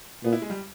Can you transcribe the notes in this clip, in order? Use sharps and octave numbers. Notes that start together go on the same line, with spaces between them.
A#2 B3
E4
G#3
G3